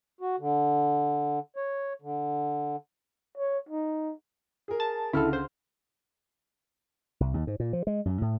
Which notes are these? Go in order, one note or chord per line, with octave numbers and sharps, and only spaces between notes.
F#4
D3
C#5
D3
C#5
D#4
G#4 A#4
A5 A6
C#2 D3 E4 A4 F6
C5
C2
D#2
G#2
A#2
F3
G#3
F#2
A2